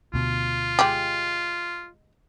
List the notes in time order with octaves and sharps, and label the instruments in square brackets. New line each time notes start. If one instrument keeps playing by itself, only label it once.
[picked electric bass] D2 B2 [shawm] F4
[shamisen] G#3 G4